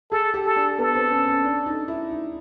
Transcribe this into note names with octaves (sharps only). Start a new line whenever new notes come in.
G#4 A4
G4
A4
D4
B3 A4
C4
C#4
C#4
D4
D#4
E4
D#4